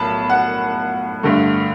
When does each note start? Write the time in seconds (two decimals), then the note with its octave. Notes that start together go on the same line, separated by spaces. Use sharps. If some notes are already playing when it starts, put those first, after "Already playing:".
Already playing: B1 A2 A5 B5
0.30 F#5
1.23 G2 D3 A3